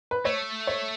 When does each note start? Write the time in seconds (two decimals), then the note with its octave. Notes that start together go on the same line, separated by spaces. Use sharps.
0.11 B4
0.25 A3 C#5
0.67 C#5